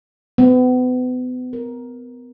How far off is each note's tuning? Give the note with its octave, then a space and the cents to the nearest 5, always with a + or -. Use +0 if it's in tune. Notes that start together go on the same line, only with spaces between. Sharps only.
B3 +35
A#4 +10